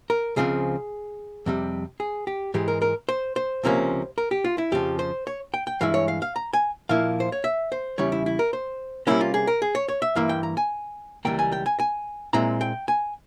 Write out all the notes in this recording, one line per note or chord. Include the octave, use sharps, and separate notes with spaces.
A#4
C#2 C#3 F3 C4 G#4
F2 C3 G3
G#4
G4
G#2 E3 G#3 G4
A#4
A#4
C5
C5
C#2 C3 F3 A#3 C#4
A#4
G4
F4
E4
F2 C#3 F3 G4
C5
C#5
G5
G5
G2 E3 G#3 E4 F5
C#5
F5
F5
A#5
G#5
A#2 F3 A#3 E4 F5
C5
C#5
E5
C5
E2 C#3 G3 C#4 E4 C#5
E4
E4
A#4
C5
C3 G3 A#3 C#4 E4
F4
G#4
A#4
G#4
C#5
C#5
E5
G2 E3 A#3 E4 F5
G5
A#5
G#5
C#2 C3 E3 G3 A#3 G5
G#5
G5
G#5
G#5
A#2 G#3 C4 E4 A#5
G5
G#5